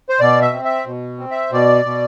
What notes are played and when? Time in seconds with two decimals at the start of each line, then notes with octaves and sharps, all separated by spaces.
0.09 C5
0.20 B2 D5
0.42 E5
0.53 C4
0.65 E5
0.86 B2
1.19 C4
1.31 E5
1.52 B2 D5
1.85 B2